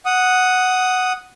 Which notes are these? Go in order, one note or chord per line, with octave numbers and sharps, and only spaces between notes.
F#5 D#6